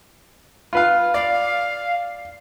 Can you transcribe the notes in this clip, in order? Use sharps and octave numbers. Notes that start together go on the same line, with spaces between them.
F4 B4 F5
D5 F5